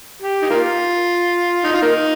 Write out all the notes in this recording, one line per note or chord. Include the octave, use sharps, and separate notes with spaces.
G4
D#4
A#3 F4
D#4
F4
A#3 D#4